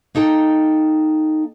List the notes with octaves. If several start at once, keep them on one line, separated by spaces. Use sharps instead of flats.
A#3 D#4 A4 G5